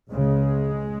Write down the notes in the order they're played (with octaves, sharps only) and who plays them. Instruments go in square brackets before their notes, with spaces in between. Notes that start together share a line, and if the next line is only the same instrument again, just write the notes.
[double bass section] C#2 C#3 G#3